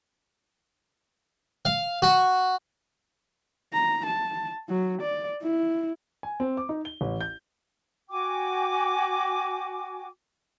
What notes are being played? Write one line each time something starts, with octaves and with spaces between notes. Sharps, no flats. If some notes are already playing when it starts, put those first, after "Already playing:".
F5
F#4
A#5
A5
F#3
D5
E4
G#5
C4
D6
D#4
G7
A1
G6
F#4 G5 G#5 D6